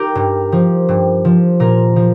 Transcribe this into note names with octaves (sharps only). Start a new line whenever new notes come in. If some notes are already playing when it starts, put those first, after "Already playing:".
Already playing: D#4 G4 A#4
G2
F3
G2
F3
A#2 A#4
F3